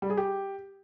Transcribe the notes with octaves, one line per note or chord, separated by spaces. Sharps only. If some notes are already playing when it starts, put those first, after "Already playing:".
G3
G#4
G4